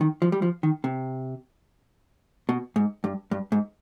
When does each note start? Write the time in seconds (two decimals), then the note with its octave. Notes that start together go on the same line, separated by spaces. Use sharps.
0.01 D#3
0.22 F3
0.32 G3
0.42 F3
0.63 D#3
0.84 C3
2.49 B2
2.76 G#2
3.04 G2
3.31 G2
3.52 G#2